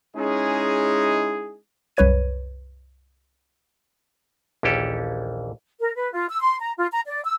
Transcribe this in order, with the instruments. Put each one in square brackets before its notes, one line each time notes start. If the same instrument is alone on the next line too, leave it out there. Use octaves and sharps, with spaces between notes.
[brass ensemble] G#3 C#4 D#4 E4 G#4
[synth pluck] C2 F#2 B4 C#5 G#6 D#7
[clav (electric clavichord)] A#1 D#2 E3 C#4 G4 A4
[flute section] A#4
B4
F4
E6
C6
A#5
F4
A#5
D5
E6